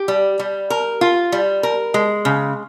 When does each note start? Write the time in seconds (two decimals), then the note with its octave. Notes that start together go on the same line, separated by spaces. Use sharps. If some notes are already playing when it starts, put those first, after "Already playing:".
Already playing: G4
0.08 G3
0.39 G3
0.70 A#4
1.01 F4
1.32 G3
1.63 A#4
1.94 G#3
2.25 C#3